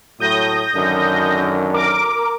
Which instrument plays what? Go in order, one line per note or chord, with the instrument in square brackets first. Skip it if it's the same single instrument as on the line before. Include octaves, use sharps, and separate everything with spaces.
[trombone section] A2 F#3 A3 [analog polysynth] D#6 G6 A#6
[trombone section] F#2 D3 D#3
[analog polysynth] A#4 D6